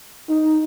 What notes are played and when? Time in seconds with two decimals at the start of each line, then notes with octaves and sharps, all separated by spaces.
0.29 D#4